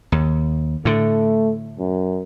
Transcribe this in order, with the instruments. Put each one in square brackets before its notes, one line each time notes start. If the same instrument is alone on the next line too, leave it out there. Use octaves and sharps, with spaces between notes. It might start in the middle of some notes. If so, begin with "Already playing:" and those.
[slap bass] D#2
[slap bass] A2 D3 [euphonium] A3
[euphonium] F#2